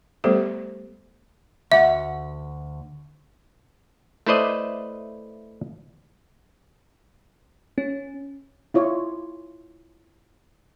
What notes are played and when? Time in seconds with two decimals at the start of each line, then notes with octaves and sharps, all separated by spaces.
0.24 G3 A3 B3 G4 A4 C5
1.72 D2 E5 F#5
4.27 A3 E4 B4 C5 D5 D#5
7.78 C#4
8.74 E4 F4 C#5 D5